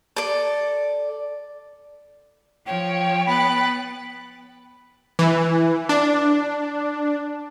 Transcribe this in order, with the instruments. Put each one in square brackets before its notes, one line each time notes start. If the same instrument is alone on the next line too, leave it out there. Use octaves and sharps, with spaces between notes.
[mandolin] A4 D5
[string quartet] F3 C#5 [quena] G5
[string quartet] B3 F#6 A6 [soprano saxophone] B5
[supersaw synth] E3
D4